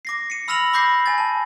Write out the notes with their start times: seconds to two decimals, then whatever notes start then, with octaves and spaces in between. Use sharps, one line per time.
0.05 D6 A#6 C7
0.30 C#7 D#7
0.48 B5 E6 F6 A#6 F7 F#7
0.73 B5 D6 G6 A#6 C7
1.06 G#5 A6
1.18 A5